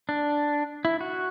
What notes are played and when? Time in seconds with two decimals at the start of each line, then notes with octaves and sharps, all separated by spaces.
0.09 D4
0.85 E4
1.01 F#4